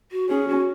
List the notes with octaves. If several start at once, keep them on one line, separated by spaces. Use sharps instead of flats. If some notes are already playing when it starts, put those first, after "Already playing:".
F#4
C#4 G#4
F#4